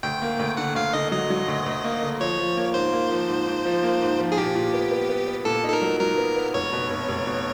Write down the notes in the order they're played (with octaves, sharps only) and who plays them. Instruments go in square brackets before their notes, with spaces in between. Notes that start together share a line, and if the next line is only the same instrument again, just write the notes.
[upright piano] D2 [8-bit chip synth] G5
[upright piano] A#3
D2
[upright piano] D3 [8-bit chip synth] F#5
[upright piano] D2 [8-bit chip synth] F5
[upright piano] D3 [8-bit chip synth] D#5
[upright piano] F#3 [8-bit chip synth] D#5
[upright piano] F#3
D2
D2
A#3
D3
[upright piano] F3 [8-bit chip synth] C#5
[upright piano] F3
A#3
[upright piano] G#2 [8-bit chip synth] C5
[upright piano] A#3
F3
G#2
G#2
F3
A#3
G#2
F3
[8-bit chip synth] G#4
[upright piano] A#2 [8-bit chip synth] G4
[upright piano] A#2
B3
B3
B3
B3
[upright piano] A#2 [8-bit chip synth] A4
[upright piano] D#4 [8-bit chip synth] A4
[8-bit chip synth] A#4
[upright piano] F#3
[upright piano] F#3 [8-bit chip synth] A#4
[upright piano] B3
B3
[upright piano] F1 [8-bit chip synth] C#5
[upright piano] B2
F1
F1
B2